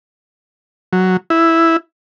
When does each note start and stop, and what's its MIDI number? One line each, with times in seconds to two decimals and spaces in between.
0.93 1.17 54
1.30 1.77 64